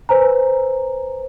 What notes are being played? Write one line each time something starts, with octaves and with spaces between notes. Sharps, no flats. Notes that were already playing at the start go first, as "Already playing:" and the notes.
B4 C5 G#5 A#5